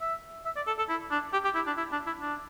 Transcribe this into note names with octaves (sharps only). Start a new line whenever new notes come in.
E5
E5
D5
A4
A4
E4
D4
G4
G4
E4
D4
E4
D4
E4
D4